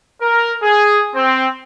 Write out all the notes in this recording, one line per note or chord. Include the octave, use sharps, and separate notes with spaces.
A#4
G#4
C4